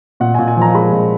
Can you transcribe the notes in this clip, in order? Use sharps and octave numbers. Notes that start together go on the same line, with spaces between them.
A#2 F#5
G#5
A#2
G#5
F3 A#5
G#3 B5
A#2